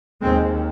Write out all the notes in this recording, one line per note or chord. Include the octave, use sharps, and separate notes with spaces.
D#2 G#3 C4